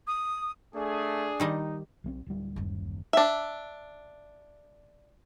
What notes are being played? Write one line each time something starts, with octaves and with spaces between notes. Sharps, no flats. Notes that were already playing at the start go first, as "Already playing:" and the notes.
D#6
A3 D4 G#4
D#3 G3 D#4 D#5
B1 G3 C4
D1 G3
F#1 D#2
D4 E5